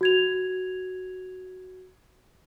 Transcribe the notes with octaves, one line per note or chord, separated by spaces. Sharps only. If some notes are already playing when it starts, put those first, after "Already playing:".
F#4 G#6 F7